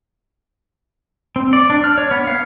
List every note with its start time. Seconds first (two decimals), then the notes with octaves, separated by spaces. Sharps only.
1.36 C4
1.53 D5
1.70 D4
1.84 F6
1.98 C#5
2.11 B3
2.27 F5